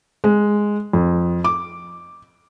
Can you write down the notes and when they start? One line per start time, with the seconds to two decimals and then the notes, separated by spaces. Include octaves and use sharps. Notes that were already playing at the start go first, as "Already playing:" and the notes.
0.24 G#3
0.93 F2
1.44 D6